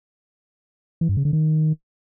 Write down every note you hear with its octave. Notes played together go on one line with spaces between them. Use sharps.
E3
G2
C#3
D3
D#3